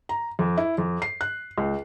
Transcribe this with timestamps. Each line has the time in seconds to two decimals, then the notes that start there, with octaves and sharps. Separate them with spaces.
0.09 A#5
0.39 F2
0.58 E4
0.78 F2
1.02 C7
1.21 F#6
1.58 C#2